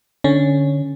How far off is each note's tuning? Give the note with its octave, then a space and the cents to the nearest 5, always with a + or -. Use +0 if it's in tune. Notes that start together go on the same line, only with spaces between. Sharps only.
D3 +0 C#4 +0